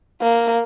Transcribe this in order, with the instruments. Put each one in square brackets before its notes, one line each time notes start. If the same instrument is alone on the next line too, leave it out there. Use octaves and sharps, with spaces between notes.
[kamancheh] A#3